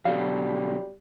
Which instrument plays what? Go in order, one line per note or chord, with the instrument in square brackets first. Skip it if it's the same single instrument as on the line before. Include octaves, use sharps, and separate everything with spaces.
[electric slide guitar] B2 D3 F#3 [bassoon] G3 [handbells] F5